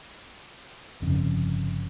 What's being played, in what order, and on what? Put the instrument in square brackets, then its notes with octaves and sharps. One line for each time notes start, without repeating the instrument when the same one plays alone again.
[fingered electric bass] G1 F2 C#3